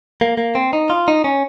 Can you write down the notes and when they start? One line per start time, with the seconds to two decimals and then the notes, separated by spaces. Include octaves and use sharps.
0.21 A#3
0.38 A#3
0.55 C4
0.73 D#4
0.90 F4
1.08 D#4
1.24 C#4